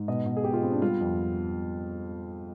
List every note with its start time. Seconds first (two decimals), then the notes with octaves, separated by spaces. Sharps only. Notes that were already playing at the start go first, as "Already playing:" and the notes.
Already playing: G#2
0.08 B2 D#5
0.26 B2
0.37 G#4
0.44 B3 G4
0.53 F4
0.63 B3 C4
0.72 D4
0.81 G3 F4
1.01 F2